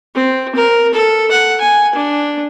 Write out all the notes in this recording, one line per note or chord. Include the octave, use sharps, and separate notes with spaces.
C4
A#4
A4
F#5
G#5
D4